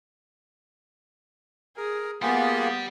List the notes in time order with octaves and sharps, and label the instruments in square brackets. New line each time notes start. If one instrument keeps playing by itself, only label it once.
[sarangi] G#4 [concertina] A#4
[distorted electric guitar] G3 [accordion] A#3 G#4 [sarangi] B3 [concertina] F4 G4 F#5